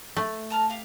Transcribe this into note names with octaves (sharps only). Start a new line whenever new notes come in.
A3
A5 A#5 F6
G4 F5